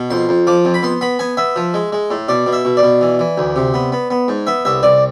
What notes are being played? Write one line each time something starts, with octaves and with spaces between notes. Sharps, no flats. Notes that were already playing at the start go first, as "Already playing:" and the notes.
Already playing: B2
F2 C6
F2
F3 D6
F2
B5
B3 C6
B3 B5
B3 G#5
B3 E5
F3
G#3
G#3
A2
B2 D5
B2
E5
B2
D5
B2
E3
E3
D2
C3
B3
B3
B3
G#2
B3 E5
C2 E5
C2 D5